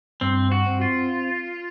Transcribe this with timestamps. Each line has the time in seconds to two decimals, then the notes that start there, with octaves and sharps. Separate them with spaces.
0.21 G2 C4
0.52 F#4
0.66 C4
0.81 F4